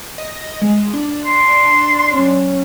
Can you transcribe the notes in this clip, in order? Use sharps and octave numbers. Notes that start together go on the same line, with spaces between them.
D#5
G#3
D4
C6
F#3 C#4